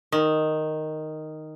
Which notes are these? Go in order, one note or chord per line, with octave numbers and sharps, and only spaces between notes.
D#3